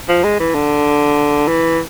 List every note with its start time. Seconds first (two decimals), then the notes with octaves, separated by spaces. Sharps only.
0.09 F3
0.24 G#3
0.40 E3
0.55 D3
1.48 E3